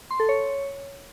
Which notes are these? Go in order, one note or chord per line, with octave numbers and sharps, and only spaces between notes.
C6
A4
C#5